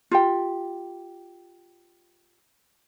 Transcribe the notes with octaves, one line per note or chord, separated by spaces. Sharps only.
F4 G4 G5